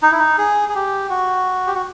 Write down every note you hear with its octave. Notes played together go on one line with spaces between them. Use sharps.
D#4
E4
D#4
G#4
G#4
G4
F#4
G4
F#4